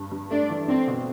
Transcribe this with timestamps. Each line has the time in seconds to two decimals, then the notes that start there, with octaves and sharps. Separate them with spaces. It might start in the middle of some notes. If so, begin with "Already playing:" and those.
Already playing: G2
0.11 G2
0.30 A3 D4
0.50 E3
0.68 C4 D4
0.87 B2